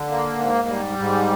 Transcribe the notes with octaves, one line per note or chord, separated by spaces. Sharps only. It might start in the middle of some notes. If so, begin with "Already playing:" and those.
Already playing: D3
A#3
G#2
G3
G#2